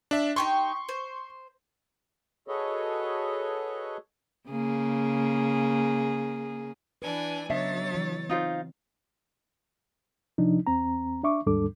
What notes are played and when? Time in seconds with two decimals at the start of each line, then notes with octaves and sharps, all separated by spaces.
0.11 D4 E5
0.36 D#4 G4 G5 C6 C#6
0.89 C5
2.48 F#4 G#4 A4 B4 C#5 D#5
4.49 C#3 A#3 G#4
7.02 E3 D4 B4 G#5
7.50 C#3 F#3 B3 D4 C#5 D#5 E5 A6
7.95 E3
8.29 C4 D#4 F4 C5
10.38 C3 F3 D4 D#4
10.67 E2 C4 A#5
11.24 D4 E5 C#6 D6
11.47 D#2 G#2 G3 D4 A4 D6